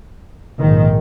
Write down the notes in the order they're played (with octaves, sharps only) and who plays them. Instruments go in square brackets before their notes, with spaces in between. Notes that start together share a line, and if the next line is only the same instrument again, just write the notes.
[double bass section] A#1 G#2 D#3